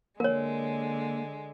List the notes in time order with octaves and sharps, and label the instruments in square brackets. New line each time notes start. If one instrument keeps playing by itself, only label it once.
[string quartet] D3 G#3 [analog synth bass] A#3 [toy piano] A#4 C#5